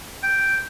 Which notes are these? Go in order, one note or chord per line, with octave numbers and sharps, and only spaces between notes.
G5